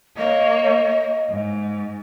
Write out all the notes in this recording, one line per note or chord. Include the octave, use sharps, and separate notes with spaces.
A#3 C#5 D#5
G#2